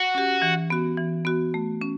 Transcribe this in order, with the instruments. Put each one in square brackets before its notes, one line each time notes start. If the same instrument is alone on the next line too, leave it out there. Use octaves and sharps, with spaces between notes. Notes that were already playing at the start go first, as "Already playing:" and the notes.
Already playing: [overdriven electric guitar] F#4
[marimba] C#4 G4
E3
B3 F#4
E3
B3 F#4
A3
C#4